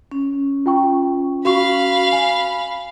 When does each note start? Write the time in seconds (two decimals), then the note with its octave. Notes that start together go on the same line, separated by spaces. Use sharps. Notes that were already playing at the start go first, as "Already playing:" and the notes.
0.11 C#4
0.66 F4 G5 C#6
1.45 F#4 F5 B5 C#6
2.13 G#5